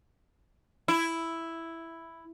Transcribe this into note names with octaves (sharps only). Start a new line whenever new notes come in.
E4